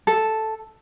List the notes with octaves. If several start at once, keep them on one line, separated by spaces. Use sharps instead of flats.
A4